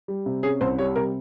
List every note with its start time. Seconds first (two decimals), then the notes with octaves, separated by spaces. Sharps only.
0.08 G3
0.26 C3
0.43 C#4 G#4
0.61 C2 C5
0.78 G3 C#5
0.96 C3 A#4